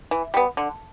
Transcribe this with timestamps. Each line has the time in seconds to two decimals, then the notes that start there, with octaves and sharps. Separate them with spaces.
0.11 E3
0.34 G3 B3
0.57 D3